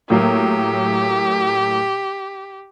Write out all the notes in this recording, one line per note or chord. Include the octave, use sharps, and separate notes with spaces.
A2 F#3 A#3 G4